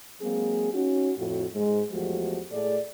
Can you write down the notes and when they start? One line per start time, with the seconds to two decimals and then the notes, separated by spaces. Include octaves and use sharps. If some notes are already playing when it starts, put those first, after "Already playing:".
0.20 F#3 G#3 A#3 C4 G#4
0.72 C#4 D#4 F#4
1.17 F2 A2 F4 F#4
1.53 G#2 G#3
1.91 E2 F3 G#3 A3 F#4 G4
2.51 A2 A3 G#4 D5